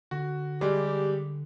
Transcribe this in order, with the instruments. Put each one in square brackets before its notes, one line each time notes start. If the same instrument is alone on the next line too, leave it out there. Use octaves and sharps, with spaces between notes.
[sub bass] D3 [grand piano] F#4
[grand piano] G3 G#3 [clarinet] G4